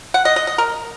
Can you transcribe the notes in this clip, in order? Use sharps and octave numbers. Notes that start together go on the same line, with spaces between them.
F#5
D#5
D#5
D#5
A#4